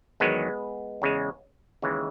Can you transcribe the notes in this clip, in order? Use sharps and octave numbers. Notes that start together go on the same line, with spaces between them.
E2 D#3 F#3 G#3 B3
E2 C#3 G#3
D#2 C#3 E3 G#3